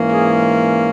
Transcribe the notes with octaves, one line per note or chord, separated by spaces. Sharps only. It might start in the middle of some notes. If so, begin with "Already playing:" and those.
Already playing: G#2 E3 A#3 C#4
G#4